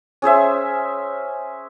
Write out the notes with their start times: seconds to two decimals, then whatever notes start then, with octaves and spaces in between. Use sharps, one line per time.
0.22 C#4 G#4 C5 E5